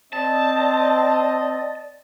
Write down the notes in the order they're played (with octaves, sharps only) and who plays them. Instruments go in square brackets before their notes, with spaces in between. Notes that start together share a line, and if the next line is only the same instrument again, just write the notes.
[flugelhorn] C4 [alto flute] D5 [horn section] D#5 [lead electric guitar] A5